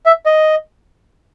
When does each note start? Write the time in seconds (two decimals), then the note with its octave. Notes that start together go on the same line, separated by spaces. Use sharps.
0.06 E5
0.26 D#5